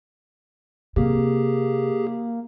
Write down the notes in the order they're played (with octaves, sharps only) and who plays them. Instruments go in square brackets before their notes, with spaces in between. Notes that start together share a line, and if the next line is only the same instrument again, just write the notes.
[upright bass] C3 [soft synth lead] A#3 [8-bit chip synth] G4 G#4